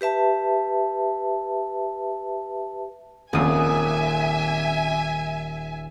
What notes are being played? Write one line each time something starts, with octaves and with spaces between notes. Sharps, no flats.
G4 B4 E5 A5
D#1 F2 A#2 C#3 E5 G#5 D#6